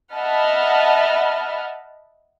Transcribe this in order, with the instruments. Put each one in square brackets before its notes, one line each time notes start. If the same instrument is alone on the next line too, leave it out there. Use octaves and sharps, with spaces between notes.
[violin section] D#5 E5 F#5 A5 B5 F6